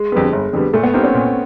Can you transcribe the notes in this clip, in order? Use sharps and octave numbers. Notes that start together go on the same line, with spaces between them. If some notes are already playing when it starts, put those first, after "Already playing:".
Already playing: G#3
F2 D3 G3 B3
G1
F2 D3 G3 B3
A#2 A3
B3
G3 A#3 C4 D#4
C#4
A#2